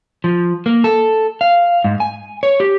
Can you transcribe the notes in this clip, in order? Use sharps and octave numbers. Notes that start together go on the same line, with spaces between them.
F3
A#3
A4
F5
G#2
G#5
C#5
G4